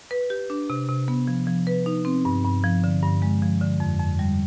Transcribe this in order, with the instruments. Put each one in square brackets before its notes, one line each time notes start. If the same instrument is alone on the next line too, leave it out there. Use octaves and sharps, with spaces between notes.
[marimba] B4
G4
D4
C3
C3
B3
F3
F3
B4
D#4
C4
G2
G2
F3
D3
G2
G#3
F3
D3
F2
F2
G3